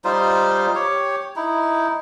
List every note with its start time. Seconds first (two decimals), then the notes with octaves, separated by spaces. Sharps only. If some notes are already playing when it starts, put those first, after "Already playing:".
0.04 G3 D#4 F4 C5
0.75 G4 C#5
1.36 D#4 E4